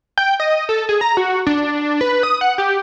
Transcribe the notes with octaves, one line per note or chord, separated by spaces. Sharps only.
G5
D#5
A4
G#4
A#5
F#4
D4
B4
D#6
F#5
G4